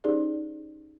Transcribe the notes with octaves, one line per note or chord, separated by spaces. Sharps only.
C#4 D#4 G4 G#4 C5 D5